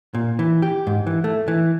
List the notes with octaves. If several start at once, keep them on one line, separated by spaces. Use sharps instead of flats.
A#2
E3
G4
G#2
E3
A3
E3